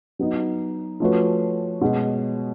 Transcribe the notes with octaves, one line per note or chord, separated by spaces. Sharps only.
F#3 B3 D#4
F3 A3 C#4 F#4 B4
B2 G#3 C#4